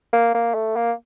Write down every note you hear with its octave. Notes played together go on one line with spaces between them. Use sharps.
A#3
A#3
A3
A#3